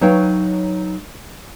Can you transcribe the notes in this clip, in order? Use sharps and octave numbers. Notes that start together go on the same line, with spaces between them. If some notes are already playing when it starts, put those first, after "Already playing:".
F#3 D#4 B4 C#5 F5 G5